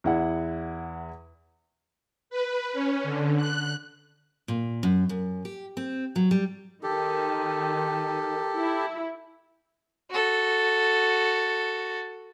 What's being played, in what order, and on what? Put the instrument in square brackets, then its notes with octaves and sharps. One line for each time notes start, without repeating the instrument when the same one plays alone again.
[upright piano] E2 E4 F#5
[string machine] B4
C#4
D3
F#6
[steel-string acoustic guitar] A#2
F#2
F#2
G4
C4
F#3
G3
[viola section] D#3 [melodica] G4 A4
[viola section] E4
[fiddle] F#4 A4